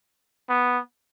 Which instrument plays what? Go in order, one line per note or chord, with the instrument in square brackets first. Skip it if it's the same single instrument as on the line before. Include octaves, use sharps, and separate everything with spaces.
[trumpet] B3